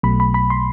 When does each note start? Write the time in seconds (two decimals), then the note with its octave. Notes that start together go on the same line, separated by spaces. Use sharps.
0.03 B1 B2 F#3 A3 B5
0.20 B5
0.34 B5
0.50 C6